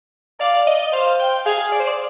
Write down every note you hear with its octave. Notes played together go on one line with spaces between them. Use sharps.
D5 F5
D#5
C5 F5
G5
G#4 F5
D5
C5
D5